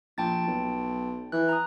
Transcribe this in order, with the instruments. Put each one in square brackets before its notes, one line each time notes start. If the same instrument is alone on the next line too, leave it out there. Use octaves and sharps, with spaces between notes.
[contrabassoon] A#1 [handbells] G5 A5 A6
[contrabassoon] B1
[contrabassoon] E3 [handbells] F#6
[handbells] A#5 D#6